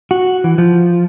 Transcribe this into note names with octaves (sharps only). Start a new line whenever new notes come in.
F#4
E3
F3